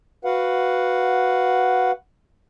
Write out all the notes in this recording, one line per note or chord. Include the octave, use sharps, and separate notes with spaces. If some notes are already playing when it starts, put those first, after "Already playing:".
F#4 B4 F5 F#5